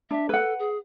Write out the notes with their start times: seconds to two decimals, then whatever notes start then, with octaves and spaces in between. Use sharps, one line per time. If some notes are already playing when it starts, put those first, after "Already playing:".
0.11 D4 E5
0.29 A4 B4 F#5
0.59 G#4